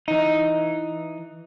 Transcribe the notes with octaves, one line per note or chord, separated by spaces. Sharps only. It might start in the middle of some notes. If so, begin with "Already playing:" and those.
E3 D#4